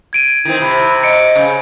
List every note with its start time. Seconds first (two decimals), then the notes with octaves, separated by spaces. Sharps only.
0.13 G#6 D7 D#7
0.45 D#3 C4 E4
0.61 C3 B5
1.03 D#5 C#7 D7
1.36 C#3